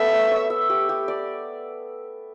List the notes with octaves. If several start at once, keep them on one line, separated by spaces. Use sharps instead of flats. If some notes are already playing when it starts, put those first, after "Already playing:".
Already playing: A3 B3 A4 E5
C#5
C#5
E5
G4
G4
D5